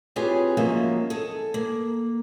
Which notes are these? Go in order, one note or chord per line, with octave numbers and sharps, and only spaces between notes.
C4 F4 G4 G#4 B4 C#5
F3 F#3 G#3 A#3 C#4 E5
G#4 A4
A#3